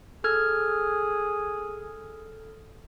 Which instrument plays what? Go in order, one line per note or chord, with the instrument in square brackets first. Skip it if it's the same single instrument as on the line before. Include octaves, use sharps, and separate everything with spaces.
[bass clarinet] G#4 [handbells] A4 F6 G#6